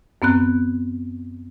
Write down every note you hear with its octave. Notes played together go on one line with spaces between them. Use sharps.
F#2 B3 C4 F#6